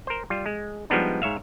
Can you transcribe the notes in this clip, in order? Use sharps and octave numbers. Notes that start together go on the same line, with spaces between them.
A#4 C5
G3 F4
G#3
F3 G3 G#3 B3 D4 D#4
G#2 C#5 E5 F5